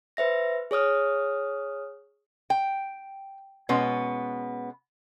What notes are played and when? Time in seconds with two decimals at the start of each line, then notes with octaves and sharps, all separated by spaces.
0.17 B4 C5 E5 A#6
0.71 G#4 C#5 D#6 F6
2.50 G5
3.69 B2 G#3 B3 C#4